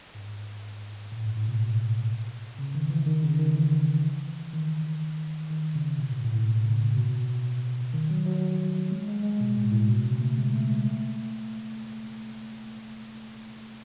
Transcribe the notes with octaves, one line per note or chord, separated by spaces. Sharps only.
G#2
A2
G#2
A2
B2
C#3
D#3
E3
D#3
C#3
D#3
E3
D#3
D#3
C#3
B2
A2
A2
A2
C#3
B2
D#3
F#3
F#3
G#3
G#3
G#3
B2
A2
A2
B2
C#3
A3
G#3
A3
G#3
A3